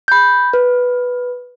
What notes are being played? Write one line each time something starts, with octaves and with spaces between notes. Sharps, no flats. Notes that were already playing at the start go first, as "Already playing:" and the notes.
B5 G6
B4